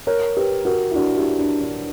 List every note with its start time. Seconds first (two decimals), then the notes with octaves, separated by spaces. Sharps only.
0.07 A#4 C#5
0.37 G4 B4
0.65 F#4 A#4
0.91 E4
0.95 D4 F#4
1.17 E4 G4
1.39 D4
1.61 D4